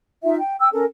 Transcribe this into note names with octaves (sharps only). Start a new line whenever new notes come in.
D#4 F4 E5
G5
G5 E6
C#4 A4 A#4